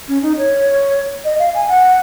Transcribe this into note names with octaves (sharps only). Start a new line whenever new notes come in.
C#4
D#4
C#5
D#5
F5
G#5
F#5